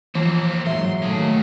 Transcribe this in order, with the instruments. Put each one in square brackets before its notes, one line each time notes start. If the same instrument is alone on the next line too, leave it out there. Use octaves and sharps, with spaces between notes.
[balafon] E3 [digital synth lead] F3 [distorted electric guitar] A#3 C4
[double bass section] G#2 [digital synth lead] F#3 [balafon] E5 [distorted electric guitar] C6
[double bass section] D#3 A3 [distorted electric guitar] A#3 G#4